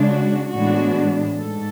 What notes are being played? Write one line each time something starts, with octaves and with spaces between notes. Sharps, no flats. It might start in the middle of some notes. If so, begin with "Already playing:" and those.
Already playing: C#3 G#3 D4
F#4
A2 E3 G#3 B3 D4 F#4
G#2 A4